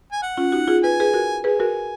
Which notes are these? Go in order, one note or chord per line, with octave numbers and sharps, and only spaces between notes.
G#5
F#5
C#4 F4
D#4 F#4
F4 G#4
B4 G#5
G#4 B4
F#4 A#4
G#4 B4 G#5
F#4 A#4